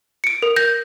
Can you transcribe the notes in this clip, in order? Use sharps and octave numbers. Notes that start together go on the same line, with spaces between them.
C#7 D7
A#4
G6 A#6